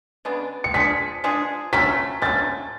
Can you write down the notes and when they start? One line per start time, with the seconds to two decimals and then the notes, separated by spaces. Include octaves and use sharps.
0.25 C#3 G#3 B3 D4
0.64 C#7
0.74 F3 G#3 D4 G#4 B6
1.24 F3 G#3 D4 G#4
1.73 D3 F#3 A3 C#4 B6
2.22 D3 F#3 A3 C#4 A6